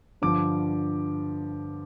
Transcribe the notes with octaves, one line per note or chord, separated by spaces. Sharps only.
G2 D3 F3 D6